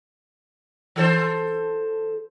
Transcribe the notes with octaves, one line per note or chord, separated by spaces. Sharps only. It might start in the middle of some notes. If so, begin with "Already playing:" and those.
E3 A4 C5